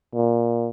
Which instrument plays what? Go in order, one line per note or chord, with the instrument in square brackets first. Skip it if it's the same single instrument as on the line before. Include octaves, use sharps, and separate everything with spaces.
[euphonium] A#2